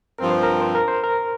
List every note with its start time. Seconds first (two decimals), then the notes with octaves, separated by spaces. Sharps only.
0.19 G2 F3 C4 A#4
0.31 C5
0.43 A#4
0.61 C5
0.75 A#4
0.88 C5
1.04 A#4